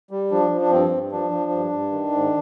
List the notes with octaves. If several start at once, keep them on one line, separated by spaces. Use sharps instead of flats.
G3
F3 D4
F3
D4
G2 C4
G2
F3 D4
F3
G2
G2
D#3
G#2